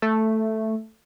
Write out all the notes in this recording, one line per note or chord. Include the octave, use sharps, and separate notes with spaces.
A3